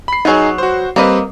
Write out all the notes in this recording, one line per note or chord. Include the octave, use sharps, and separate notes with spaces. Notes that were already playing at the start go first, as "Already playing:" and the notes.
B5 C7
F#3 B3 D#4 G#4
F#4 C5
G3 A#3 C4 B4 D#5